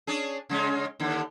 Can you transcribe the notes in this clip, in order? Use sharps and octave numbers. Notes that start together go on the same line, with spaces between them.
C#4 D4 G#4
C#3 G#3 C#4
D#2 D3